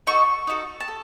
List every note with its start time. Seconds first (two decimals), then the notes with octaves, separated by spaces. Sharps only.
0.07 D#4 F#4 A4 C#6
0.47 D#4 F#4 A4
0.80 A5
0.88 A4